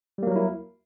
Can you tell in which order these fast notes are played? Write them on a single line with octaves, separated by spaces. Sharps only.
G3 A#3 F#3 A#4 E4